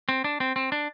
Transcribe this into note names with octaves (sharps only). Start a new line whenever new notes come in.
C4
D4
C4
C4
D4